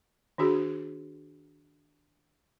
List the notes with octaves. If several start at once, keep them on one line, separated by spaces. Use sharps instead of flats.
D#3 D4 F#4 G#4